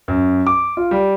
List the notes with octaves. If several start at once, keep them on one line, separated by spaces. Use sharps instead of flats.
F#2
D6
F4
G3